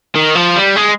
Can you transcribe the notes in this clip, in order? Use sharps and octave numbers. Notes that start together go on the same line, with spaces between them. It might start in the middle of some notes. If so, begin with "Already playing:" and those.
D#3
F3
G3
G#3